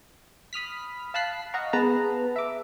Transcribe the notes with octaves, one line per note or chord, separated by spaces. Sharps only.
B5 D#6 F6 B6
F5 A5 B5 F#6 B6 C7
D#5 F5 F#5 A#5 C#6
B3 G#4 B4 A5 A#5
E5 D6